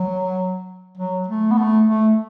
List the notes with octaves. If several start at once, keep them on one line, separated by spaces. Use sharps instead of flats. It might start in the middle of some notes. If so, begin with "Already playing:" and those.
Already playing: F#3
F#3
A3
B3
A3
A3